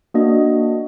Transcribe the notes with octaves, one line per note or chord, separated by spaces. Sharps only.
A#3 D4 F#4 D#5